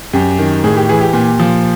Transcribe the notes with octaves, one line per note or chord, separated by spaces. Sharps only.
F#2 G4
D#3
A2 G#4
G4
E3 G#4
G4
A#2
F3